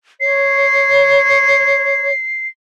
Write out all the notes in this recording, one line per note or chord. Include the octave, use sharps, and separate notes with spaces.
C#5 C7